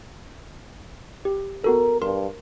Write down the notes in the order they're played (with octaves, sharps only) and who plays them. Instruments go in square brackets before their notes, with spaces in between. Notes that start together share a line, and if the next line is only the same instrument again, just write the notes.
[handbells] G4
[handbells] B3 F#4 A4 [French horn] A#4
[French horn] G2 [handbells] A#4 C6